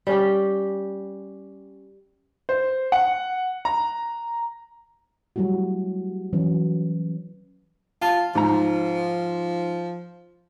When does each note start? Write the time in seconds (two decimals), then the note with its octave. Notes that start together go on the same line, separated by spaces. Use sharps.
0.07 G3 C#4 G4
2.49 C5
2.92 F#5
3.65 A#5
5.36 F#3 G3 A3 E4 F#4
6.33 E3 F#3 C#4
8.02 F4 A5
8.35 G#2 F3 A#5